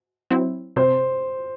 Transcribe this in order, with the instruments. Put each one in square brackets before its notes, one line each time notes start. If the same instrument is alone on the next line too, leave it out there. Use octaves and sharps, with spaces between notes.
[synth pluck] F#3 C4 E4
[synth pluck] C3 [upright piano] C5